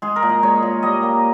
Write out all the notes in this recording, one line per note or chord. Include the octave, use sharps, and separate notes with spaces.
G#3 G#4
A#4
A#2
D#5
G#3 C#5
A#2
G3 D#5
A#3